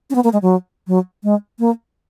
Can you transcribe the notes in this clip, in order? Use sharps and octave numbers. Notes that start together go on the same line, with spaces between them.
C#4
B3
A#3
G#3
F#3
F#3
G#3
A#3